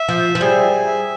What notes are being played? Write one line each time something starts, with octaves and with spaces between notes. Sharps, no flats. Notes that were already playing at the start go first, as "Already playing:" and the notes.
Already playing: E5
F3
F3
G3 G#4
E5